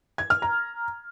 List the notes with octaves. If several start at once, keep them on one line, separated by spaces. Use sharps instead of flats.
G#6
F6
A#5